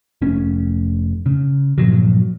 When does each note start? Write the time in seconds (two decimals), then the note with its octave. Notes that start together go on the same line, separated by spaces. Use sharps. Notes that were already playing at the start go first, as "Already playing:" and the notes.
0.22 F1 A3 C#4
1.26 C#3
1.78 G2 A#2 F3 F#3